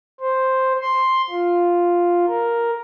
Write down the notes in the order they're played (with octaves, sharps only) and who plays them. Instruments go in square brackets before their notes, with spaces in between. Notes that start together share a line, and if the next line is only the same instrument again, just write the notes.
[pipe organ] C5
C6
F4
A#4